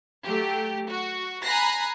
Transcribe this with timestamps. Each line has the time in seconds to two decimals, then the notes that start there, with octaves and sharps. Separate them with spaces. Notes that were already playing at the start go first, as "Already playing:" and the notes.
0.24 F#3 A3 G4
0.88 F#4
1.42 G#5 A#5 B5 F#6 A#6 C7